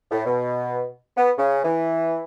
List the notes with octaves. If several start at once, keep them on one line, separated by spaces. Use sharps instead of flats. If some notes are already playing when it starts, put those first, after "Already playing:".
A2
B2
B3
C#3
E3